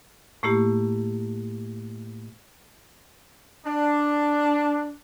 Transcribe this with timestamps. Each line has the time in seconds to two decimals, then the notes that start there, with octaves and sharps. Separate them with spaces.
0.43 A2 A3 A#3 E4 G4
3.65 D4